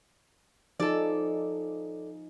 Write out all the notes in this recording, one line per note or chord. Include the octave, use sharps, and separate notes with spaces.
F3 D#4 G#4 A4 D5